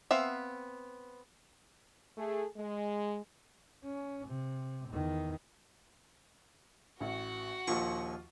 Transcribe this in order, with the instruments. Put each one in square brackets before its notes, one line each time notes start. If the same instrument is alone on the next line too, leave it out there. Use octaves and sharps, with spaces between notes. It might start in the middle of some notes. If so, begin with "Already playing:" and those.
[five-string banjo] B3 C4 E5 F5
[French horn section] A3 G#4
G#3
[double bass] C#4
C3
E2 D#3
[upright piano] A1 [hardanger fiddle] F#4 F#5
[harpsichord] A#1 D#2 C#6 [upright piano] F4